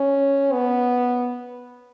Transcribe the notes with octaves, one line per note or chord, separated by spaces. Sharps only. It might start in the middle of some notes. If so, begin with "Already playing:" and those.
Already playing: C#4
B3